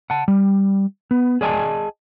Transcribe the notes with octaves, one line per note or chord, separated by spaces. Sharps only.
F#5 A5
G3
B3
G#4 D5 D#5 G#5 A5